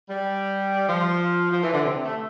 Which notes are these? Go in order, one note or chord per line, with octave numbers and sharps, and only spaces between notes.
G3
F3
F3
E3
D3
C3
A3